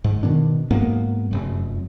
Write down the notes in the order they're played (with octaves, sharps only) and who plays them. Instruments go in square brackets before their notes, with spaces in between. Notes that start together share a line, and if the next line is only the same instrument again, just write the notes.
[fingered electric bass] G#2
B2 D#3 B3 D4
G#2 F#3 A#3 B3
F1 F#2